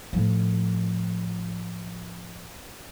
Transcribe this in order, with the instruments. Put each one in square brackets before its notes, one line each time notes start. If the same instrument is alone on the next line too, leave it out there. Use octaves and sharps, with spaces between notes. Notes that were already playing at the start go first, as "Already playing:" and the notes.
[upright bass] A2 F3